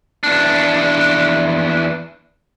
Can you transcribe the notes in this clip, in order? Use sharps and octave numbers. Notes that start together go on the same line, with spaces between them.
E2 D4